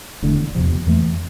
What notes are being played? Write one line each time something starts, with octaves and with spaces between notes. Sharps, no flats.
E1 E2 D3 A3
E2 C3 F3
F2 E3 A3